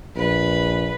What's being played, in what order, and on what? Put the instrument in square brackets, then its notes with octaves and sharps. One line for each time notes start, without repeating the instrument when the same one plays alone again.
[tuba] A#1 [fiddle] B4